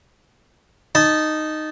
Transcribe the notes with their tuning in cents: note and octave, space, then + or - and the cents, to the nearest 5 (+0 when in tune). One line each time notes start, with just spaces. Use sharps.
D#4 -10 A5 -15